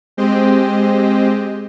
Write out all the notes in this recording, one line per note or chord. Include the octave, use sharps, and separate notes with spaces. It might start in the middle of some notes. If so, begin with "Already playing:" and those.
G#3 C4 G4 C5 D#5